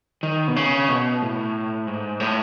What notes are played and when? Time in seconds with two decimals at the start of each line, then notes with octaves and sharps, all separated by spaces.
0.23 D#3
0.48 B2
0.56 C#3
0.89 B2
1.22 A2
1.87 G#2
2.20 A2